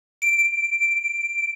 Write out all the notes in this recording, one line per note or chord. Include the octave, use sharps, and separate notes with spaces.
D7